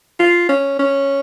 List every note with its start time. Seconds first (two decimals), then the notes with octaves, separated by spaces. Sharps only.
0.19 F4
0.49 C#4
0.79 C#4